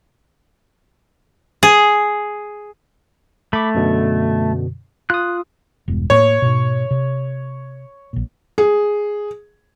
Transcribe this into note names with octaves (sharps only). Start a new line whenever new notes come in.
G#4
A3 B5 D6
F#2 B2 D3
F4 D#6 F#6
E1 E2 G2
A2 A3 A#3 C#5
G#2 B2
C3
A#1 A#2
G#4